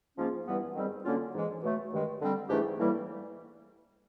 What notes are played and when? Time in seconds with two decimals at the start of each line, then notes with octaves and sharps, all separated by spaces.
0.17 G#2 F3 A#3 C#4 F4
0.46 G2 E3 G3 B3
0.75 G#2 D#3 G3 C4
1.04 D3 F#3 A#3 C#4 F4
1.33 G#2 E3 G#3
1.62 B2 F#3 A3
1.91 G2 D#3 G#3
2.20 D3 G3 C4
2.49 G#2 E3 A3 D4 G4
2.78 A2 E3 G3 A#3